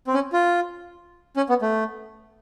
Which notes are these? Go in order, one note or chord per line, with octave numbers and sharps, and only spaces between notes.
C4
C#4
F4
C#4
B3
A3